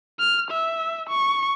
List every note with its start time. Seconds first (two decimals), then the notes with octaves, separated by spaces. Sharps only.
0.19 F6
0.51 E5
1.10 C#6